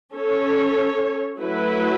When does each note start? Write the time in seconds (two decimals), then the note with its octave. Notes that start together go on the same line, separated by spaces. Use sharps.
0.14 C#4 A4 C#5
1.40 F#3 A3 E4 B4